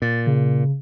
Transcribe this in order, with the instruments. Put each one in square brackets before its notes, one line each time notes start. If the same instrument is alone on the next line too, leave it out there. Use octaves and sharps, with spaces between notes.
[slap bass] A#2 [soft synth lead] A6
[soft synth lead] C#3